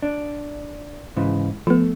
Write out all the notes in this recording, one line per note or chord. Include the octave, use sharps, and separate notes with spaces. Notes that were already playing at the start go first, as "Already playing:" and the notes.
D4
G#2 C#3 E3
F3 A3 B3